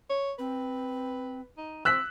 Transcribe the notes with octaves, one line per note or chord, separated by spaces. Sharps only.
C#5
C4 B4
D#4
C4 E6 F#6 B6